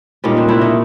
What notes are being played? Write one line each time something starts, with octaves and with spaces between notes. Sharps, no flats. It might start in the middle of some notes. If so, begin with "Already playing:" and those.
A#2 G3 C#4 D#4
C4 D4
D4 E4
C#4 D#4